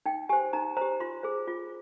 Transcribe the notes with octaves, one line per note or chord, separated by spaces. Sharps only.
D#4 G5
G4 C5 G#5
D#4 A#5
G4 C5 A#5
F4 C6
G#4 C5
F4